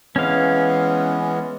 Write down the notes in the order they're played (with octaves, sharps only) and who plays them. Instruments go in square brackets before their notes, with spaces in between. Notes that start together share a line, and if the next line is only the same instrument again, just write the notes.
[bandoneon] E3 G#3 B3 [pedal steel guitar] C#4 F5